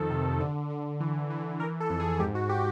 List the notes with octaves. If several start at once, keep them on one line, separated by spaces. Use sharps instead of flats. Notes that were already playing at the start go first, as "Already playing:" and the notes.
Already playing: F2 D#3 A4
C3
D3
D3
E3
E3
E3 A#4
A4
F2
G#4
G#2 G4
F#4
G4